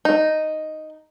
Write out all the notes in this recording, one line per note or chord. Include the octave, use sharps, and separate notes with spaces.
D#4